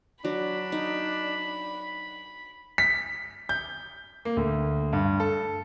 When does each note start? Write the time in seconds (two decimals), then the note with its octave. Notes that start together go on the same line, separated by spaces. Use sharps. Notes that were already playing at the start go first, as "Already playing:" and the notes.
0.24 F#3 D4 B5
0.72 D#4
2.78 B6
3.49 G6
4.25 A#3
4.37 D2
4.93 G2
5.20 A4